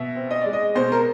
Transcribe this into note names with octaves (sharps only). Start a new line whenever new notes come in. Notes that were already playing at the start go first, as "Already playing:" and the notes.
Already playing: B2 E5
C4
D#5
G#3 D5
D#5
B2 C5
A#4